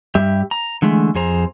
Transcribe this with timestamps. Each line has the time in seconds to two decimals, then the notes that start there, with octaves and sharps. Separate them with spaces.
0.15 G2 G3 G4 E5
0.51 A#5
0.82 D3 E3 G#3 A3
1.15 F2 G#4 C5 A#5